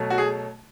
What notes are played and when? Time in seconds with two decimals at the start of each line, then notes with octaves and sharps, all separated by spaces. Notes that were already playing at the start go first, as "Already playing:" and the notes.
Already playing: B2 F#3 A3
0.10 F#4
0.18 G#4